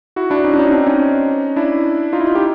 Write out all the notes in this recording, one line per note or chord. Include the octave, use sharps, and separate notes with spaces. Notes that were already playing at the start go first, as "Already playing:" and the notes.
E4 F#4
D4 E4
C#4 D#4
D4
C#4 D#4
C4 D4
C#4 D#4
D4 E4
D#4 F4
E4
D#4 F4
G4